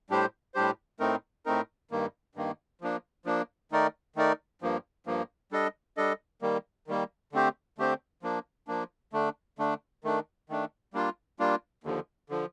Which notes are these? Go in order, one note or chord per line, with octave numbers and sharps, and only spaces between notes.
A2 G3 D4 G4 C5
A2 G3 D4 G4 C5
A2 A3 C4 D#4 A#4
A2 A3 C4 D#4 A#4
G2 D#3 A#3
G2 D#3 A#3
F3 A#3 D4
F3 A#3 D4
D#3 A3 D#4 A#4 D5
D#3 A3 D#4 A#4 D5
G2 F3 A#3
G2 F3 A#3
G3 D4 A4 D#5
G3 D4 A4 D#5
D#3 G3 A#3
D#3 G3 A#3
D3 A3 C4 G4 C5
D3 A3 C4 G4 C5
F3 A#3 D4
F3 A#3 D4
D3 A3 D4
D3 A3 D4
D#3 A3 D4
D#3 A3 D4
G3 A#3 D4 F4
G3 A#3 D4 F4
D#2 D3 F3
D3 F3